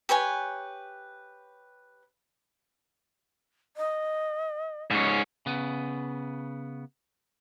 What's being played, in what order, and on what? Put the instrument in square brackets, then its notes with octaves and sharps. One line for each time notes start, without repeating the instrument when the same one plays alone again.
[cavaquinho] G4 B4 C#5 G#5
[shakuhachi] D#5
[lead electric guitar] G#2 C#4
[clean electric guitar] C#3 B3